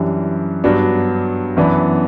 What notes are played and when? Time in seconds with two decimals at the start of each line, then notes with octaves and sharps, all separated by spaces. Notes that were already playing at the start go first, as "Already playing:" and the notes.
Already playing: F#2 E3 G3 D4
0.64 G2 F#3 B3 D4
1.57 F#2 E3 B3 D4